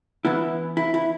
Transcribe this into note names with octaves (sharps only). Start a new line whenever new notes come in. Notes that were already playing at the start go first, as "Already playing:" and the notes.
E3 B3 E4
E4
E4